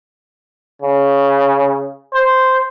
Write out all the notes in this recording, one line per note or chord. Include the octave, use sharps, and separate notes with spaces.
C#3
C5